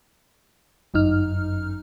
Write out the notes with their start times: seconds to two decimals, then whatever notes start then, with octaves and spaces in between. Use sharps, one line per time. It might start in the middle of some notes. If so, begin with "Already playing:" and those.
0.94 G1 F#2 D#4 F6